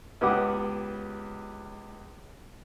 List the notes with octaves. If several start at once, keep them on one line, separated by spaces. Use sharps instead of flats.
C#2 B3 G4 F#5 D6 D#6